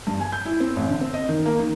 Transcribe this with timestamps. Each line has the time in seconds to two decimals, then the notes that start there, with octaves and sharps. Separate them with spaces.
0.07 G2
0.20 G#5
0.32 G6
0.45 E4
0.60 C4
0.76 A1
0.89 D3
1.01 C4
1.14 D#5
1.29 D#3
1.45 A#3
1.59 D#3